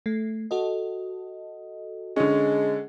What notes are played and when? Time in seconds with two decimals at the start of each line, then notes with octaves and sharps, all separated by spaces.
0.06 A3
0.51 F#4 A4 D#5
2.16 D3 G#3 C#4